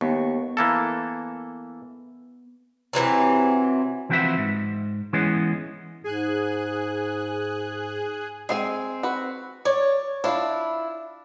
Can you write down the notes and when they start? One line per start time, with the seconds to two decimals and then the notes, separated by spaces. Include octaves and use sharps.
0.01 D#2 B3 C#6
0.57 E3 A#3 A4
2.93 C3 E3 F#3 C4
4.09 E3 F3 C4 F#4 B4 E5
4.38 G#2
5.13 E3 G#3 B3 C#4
6.04 G#2 G#4 G#5 F#6
8.49 G#3 C4 G#4 G#5
9.03 F#4 B4
9.65 C#5 D5
10.24 D4 E4 F4